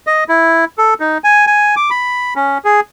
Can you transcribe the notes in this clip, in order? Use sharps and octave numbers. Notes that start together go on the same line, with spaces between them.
D#5
E4
A4
D#4
G#5
G#5
D6
B5
C#4
G#4